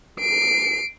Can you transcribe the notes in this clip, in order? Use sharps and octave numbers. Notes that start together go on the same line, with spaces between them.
C7 D7